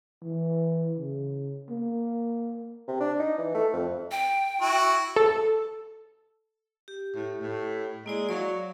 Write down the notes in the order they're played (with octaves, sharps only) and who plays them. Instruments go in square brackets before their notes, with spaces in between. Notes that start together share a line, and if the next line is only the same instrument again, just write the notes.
[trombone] E3
C#3
A#3
[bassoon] C3
D4
D#4
E3
A3
F2
[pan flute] G5
[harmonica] E4 F#4
[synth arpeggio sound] A4
[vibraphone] G4
[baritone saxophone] A2
A2
[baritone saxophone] G#3 [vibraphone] A#3 E4 D5
[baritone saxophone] F#3 [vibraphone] D5 F5